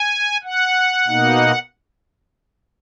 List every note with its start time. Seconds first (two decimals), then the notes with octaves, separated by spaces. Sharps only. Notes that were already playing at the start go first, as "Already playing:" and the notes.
Already playing: G#5
0.44 F#5
1.07 B2 A#3 D#4